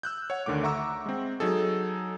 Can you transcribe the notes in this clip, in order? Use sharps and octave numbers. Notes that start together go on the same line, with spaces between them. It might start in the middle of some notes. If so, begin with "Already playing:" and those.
E6 F#6 G6
C#5 F#5
D2 D3 D#3 A3 D6
E5 F#5 A#5 C#6 D6 E6
G#3 C4
F#3 D#4 G#4 A4